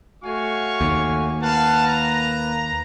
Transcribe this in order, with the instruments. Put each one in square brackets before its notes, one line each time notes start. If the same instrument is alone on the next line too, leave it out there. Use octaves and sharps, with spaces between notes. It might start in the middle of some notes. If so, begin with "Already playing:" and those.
[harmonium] A3 F#4 G#5 [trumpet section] C#5 F5 C#6
[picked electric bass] D#2
[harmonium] A#3 B4 [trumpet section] F5 F#5 A5
[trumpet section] A#5